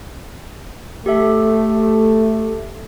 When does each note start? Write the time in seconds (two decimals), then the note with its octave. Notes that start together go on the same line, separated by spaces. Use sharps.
1.06 A3 G4 A4 E5